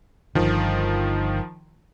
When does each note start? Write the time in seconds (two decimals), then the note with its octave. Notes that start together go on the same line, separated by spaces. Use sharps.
0.35 G1 D3 D#3 F3